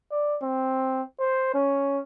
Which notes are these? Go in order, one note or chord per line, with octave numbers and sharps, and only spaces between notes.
D5
C4
C5
C#4